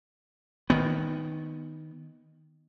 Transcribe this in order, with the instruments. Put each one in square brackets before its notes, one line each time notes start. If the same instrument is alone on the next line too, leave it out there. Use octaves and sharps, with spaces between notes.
[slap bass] D#3 B3